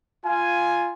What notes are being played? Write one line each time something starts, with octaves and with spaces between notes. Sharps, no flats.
F4 G#5